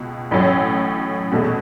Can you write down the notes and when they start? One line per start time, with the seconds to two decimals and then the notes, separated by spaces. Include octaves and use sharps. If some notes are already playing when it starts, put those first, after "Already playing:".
Already playing: C#2 B2
0.31 A1 A2 F#3 C#4
1.31 E2 B2 A3 C#4 F#4